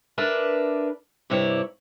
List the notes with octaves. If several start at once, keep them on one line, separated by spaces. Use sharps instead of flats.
D4 A#4 B4 D5 E5
G2 C3 E4 C#5 D5